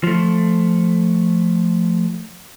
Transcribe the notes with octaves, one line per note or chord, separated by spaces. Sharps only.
F3 A3